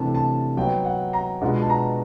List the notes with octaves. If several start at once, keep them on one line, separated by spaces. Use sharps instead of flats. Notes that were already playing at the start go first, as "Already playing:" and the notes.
Already playing: C3 E3 A3 D4 A5
A5
F#3 B3 D#4 G5
F#5
A#5
B2 G#3 B3 D4 F4
A5
A#5